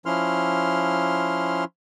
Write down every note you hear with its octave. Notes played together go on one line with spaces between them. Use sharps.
F3 C#4 E4 C6 F6